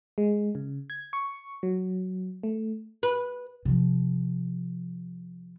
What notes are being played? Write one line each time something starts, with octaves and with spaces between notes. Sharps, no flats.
G#3
C#3
G#6
C#6
F#3
A3
B4
C3 F3